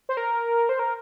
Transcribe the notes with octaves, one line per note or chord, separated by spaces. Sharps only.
C5
A#4
C5
A#4